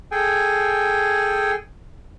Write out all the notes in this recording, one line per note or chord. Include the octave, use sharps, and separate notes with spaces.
G#4 A4 G5 G#5